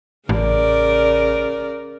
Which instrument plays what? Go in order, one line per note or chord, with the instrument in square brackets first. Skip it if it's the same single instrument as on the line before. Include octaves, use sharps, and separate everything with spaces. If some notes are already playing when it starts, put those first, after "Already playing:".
[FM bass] A1 [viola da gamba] C#3 A#4 D5